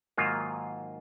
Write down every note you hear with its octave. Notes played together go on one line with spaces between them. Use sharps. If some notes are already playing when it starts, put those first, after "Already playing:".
G#2 D#3 F#3 A#3 F4